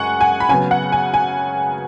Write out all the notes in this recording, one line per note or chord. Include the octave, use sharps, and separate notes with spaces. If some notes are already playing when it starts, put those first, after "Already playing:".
Already playing: F#2 G#3 F#5 G#5 C#6
G#5
B5
C#3 F#3 B3 G#5
F#5
G#5
G#5